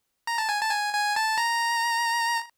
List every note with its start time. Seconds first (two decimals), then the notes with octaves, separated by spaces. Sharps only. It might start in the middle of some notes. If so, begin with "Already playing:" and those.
0.27 A#5
0.38 A5
0.49 G#5
0.61 A5
0.71 G#5
0.93 G#5
1.16 A5
1.38 A#5